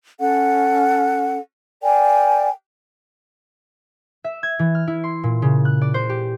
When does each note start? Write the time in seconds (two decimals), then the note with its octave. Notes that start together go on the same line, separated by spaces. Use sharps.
0.20 C#4 A4 F#5
1.83 A#4 D5 G5 G#5
4.24 E5
4.43 G#6
4.59 E3
4.75 F6
4.87 E4
5.04 C6
5.23 A#2
5.42 C#3
5.65 F#6
5.81 D5
5.94 C5
6.09 G4